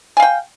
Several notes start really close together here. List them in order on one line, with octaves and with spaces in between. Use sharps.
G#5 F5 G5